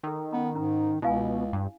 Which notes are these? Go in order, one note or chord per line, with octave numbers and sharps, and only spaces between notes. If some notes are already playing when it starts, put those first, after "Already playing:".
D#3 A4 E6
B3 C#4 A#5
G#2 C#4 A#5
C#2 B2 E4 F5 G#5
G2